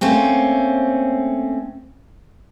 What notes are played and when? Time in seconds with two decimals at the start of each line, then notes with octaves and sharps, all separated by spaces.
0.01 A3 A#3 C4 C#4